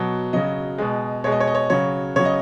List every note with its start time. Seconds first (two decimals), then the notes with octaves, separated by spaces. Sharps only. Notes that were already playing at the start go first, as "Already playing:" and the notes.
Already playing: B2 F#3
0.33 C#3 F#3 D#5
0.78 B2 G#3
1.24 B2 G#3 C#5
1.32 D#5
1.40 C#5
1.47 D#5
1.55 C#5
1.70 C#3 F#3 C#5
2.16 C#3 F#3 C#5
2.25 D#5